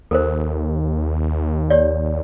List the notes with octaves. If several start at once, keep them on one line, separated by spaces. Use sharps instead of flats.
D#2 A4 A#4 C5
G4 C#5 D5